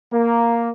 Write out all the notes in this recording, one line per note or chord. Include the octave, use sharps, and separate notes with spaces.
A#3